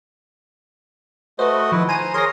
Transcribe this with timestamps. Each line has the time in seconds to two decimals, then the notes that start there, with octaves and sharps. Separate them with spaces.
1.39 A3 F#4 B4 C5 D#5
1.72 D#3 F3 E4 B4
1.89 C5 G#5 A#5 D#7
2.14 G#4 A#4 C#5 C6 A#6